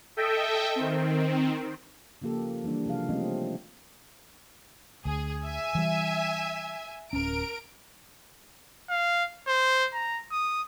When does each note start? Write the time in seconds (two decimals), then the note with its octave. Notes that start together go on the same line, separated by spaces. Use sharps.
0.17 A4 D#5 E5 G5
0.76 D#3 C4
2.22 C#3 F3 A#3 G4 A4
2.64 E3 G3 A#3 D4
2.86 C3 F3 G#4 F5
3.09 F3 G3 A3 C4 C#4 D#5
5.05 D2 G#4
5.44 E5 G#5
5.75 E3 G3
7.13 D1 C#4 A#4 D7
8.90 F5
9.47 C5
9.94 A#5
10.32 D#6